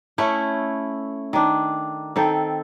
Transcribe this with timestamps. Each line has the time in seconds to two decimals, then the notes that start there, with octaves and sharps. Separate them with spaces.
0.18 A3 C#4 E4 C#5
1.33 D#3 D4
2.16 D#3 C4 A4